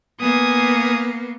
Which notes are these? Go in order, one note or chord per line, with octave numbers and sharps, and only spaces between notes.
A#3 B3 G#5 D#6